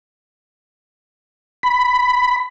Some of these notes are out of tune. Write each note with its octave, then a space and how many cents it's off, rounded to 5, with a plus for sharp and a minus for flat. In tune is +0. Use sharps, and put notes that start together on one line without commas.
B5 +5